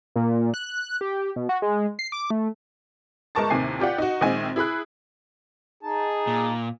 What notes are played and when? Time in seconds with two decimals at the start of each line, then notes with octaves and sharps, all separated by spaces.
0.16 A#2
0.54 F#6
1.01 G4
1.36 B2
1.49 F#4
1.62 G#3
1.99 C7
2.12 D6
2.30 A3
3.35 G1 G#3 A#4 A5 C#6 A6
3.50 D#2 A2 C3 D#3 G#5 C7
3.80 F4 G4 D5 F#5
3.98 D#4 F#4
4.21 A#1 D#3 G#3 C4 G#5
4.56 E4 G#4 B5 F#6
5.83 D#4 G#4 A5
6.27 A#2